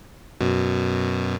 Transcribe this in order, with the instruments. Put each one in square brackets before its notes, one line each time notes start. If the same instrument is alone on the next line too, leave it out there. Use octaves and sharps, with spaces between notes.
[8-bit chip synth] F#2 B2